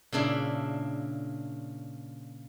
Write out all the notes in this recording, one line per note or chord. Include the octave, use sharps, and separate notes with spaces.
A#2 C#3 D4 E4